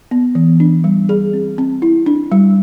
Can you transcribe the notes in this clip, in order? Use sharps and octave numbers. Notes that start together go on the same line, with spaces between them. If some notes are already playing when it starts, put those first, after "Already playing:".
B3
E3
D4
G3
G#4
C4
C4
E4
D4
G3